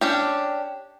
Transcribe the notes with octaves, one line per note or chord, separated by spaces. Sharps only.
C#4 D4 G4